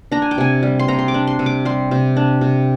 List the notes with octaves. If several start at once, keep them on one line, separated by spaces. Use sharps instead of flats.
D4 A#5
G#5
G5
C3 G#5
G3
C6
C3 A#5
C6
D6
D4
C6
C3
D6
G3 C6
C3
D4
C3